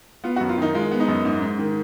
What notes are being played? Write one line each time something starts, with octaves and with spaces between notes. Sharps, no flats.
B3 F4
F#4
F#2
F4
D#3 D#4
G#3 F4
B3
D#4
F#2
G#2
G#2
D#3